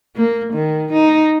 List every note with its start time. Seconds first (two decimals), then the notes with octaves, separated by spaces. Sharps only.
0.16 A#3
0.53 D#3
0.93 D#4